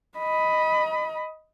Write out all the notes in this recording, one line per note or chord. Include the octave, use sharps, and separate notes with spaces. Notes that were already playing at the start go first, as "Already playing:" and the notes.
D#5 B5